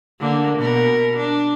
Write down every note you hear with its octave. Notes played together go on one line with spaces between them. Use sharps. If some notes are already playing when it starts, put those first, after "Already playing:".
D3 A#3
B2 A#4
D4